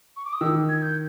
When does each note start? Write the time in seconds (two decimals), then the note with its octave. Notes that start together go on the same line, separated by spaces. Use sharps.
0.16 C#6
0.25 D6
0.33 D#6
0.41 D#3 E6
0.69 G#6
0.82 G6